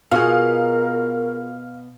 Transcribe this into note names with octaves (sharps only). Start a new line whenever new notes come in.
B2 F4 F#4 G#4 A#4 F5